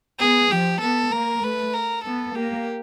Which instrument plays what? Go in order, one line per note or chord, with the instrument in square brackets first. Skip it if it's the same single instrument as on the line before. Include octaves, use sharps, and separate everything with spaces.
[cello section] B3 [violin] G#4
[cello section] F3 [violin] G4
[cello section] B3 [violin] A4
[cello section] A#3 [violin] A#4
[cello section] A3 [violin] B4
[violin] A#4
[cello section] B3 [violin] A4
[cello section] A#3 [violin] G4